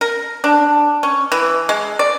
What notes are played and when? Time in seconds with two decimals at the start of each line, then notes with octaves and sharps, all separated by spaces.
0.01 A#4
0.44 D4
1.03 C#4
1.32 E3
1.69 G#3
1.99 D5